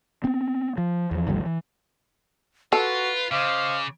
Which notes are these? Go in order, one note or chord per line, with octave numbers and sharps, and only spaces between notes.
B3 C4
F3
E2 F3
G#1 D2 F3 G3
E3
F4 F#4 A4 B4
C#3 C5 D#5 F5 D6